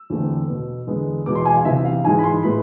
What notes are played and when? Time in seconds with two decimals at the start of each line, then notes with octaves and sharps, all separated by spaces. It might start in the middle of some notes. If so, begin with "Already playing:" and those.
Already playing: E6
0.10 E2 D3 A3 C4
0.48 B2 B3
0.87 E2 D3 G#3 B3
1.26 E2 B2 G#3 B3 D6
1.35 C6
1.45 G#5
1.56 F5
1.65 C3 E3 B3 E5
1.84 F5
2.04 G#2 E3 G#3 G#5
2.19 B5
2.24 C6
2.43 A2 G#3 B3 B5